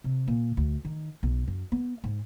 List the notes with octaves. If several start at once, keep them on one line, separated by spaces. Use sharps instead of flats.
C3
A#2
D2
D#3
B1
F#2
B3
G#2